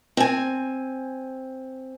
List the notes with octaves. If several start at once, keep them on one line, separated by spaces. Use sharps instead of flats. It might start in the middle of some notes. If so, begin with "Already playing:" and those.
C4 G#5